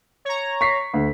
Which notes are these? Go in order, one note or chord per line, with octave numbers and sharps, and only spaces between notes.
C#5 A#5
C#6 B6 C7
D2